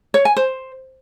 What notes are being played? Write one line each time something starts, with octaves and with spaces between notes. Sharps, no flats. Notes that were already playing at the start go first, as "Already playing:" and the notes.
C#5
G#5
C5